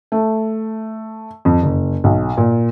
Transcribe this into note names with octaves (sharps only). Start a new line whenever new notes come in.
A3
F2
F#1
B1
A#2